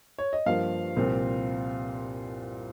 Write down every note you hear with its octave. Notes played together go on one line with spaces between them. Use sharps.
C#5
D#5
G2 F3 A#3 F5
C2 A#2 F3 C4 F4